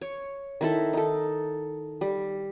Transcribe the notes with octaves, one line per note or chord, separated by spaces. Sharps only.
C#5
D#3 E4 A4
D#4 A4
G3